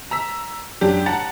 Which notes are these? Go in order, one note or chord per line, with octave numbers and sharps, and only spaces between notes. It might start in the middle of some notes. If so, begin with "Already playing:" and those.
A#5 E6 B6
F#2 D4 G4
F#5 A5 A#5 A6